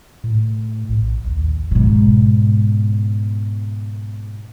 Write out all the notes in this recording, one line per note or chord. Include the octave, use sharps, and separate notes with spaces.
A2
A#1
D#2
G#2 B2